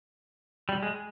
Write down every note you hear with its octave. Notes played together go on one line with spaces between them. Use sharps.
G3
G#3